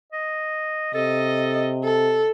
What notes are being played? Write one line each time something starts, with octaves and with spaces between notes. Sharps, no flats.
D#5
C3 A4 D#5
A4